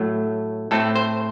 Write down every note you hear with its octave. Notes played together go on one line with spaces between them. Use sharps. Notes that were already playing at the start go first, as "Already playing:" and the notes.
Already playing: A2 F#3 A3
A2 A3 C4 A4
C5